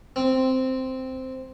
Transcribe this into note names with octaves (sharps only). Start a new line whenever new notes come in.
C4